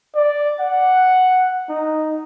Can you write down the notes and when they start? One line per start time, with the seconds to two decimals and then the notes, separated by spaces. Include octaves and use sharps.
0.15 D5
0.60 F#5
1.69 D#4